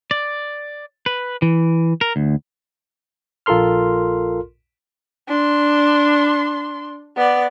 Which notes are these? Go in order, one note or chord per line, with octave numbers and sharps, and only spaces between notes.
D5
B4
E3
A#4
D2
A#1 F4 A4 A#4 C6 F6
D4 C6
B3 D5